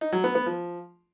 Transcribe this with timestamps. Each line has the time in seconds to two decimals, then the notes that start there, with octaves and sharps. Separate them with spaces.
0.01 D#4
0.13 F#3
0.24 B3
0.35 B3
0.46 F3